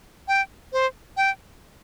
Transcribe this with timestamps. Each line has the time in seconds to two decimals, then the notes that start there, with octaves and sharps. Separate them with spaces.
0.28 G5
0.73 C5
1.17 G5